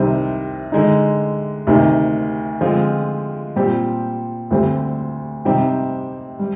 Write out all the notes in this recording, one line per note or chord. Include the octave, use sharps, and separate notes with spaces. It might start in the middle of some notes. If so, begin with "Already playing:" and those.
Already playing: C2 C3 D#3 G3 C4
D3 G#3 D#4
D2 C3 D#3
D3 F3 G#3 C4 F4
A#2 G3 C4 G4
D2 D3 G3 C4 G4
C3 G3 C4 D#4 G4
G3